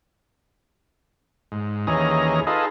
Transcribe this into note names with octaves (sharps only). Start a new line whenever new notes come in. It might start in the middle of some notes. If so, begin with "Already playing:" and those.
G#2
D#2 E3 C#4 G#4 D#5 A#5
D#4 F4 G#4 A4 B4 D#5